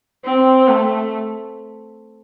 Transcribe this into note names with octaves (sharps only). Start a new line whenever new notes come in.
C4
A3